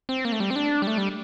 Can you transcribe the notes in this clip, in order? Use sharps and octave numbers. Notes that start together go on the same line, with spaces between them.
C4
A#3
A3
G3
C4
D4
G3
A3
G3